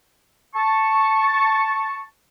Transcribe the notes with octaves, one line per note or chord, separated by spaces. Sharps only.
A5 C#6